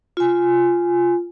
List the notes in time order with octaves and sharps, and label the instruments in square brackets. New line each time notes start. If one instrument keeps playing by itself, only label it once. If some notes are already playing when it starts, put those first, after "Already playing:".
[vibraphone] F4 G#5